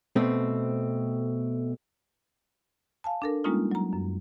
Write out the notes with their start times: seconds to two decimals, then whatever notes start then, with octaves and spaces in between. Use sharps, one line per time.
0.16 B2 A3 C4
3.04 F5 G#5 A5
3.22 D4 A4 A#4
3.44 G3 G#3 A#3 C#4 D#4 F4
3.71 F#3 A#5
3.93 F#2